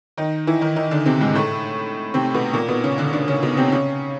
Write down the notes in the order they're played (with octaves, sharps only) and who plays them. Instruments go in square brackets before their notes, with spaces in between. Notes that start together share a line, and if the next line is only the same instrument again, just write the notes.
[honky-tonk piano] D#3 D#4
E3 E4
D#3 D#4
D#3 D#4
D3 D4
C3 C4
G#2 G#3
A2 A3
C3 C4
B2 B3
A#2 A#3
B2 B3
C#3 C#4
D3 D4
D3 D4
C#3 C#4
B2 B3
C3 C4
C#3 C#4